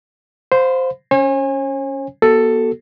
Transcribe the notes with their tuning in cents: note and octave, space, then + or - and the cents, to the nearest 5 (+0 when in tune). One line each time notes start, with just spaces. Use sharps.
C5 -5 F5 +25 B5 +35
C#4 +5 C#5 -45 G#5 -25
B3 -45 F#4 +35 A4 +10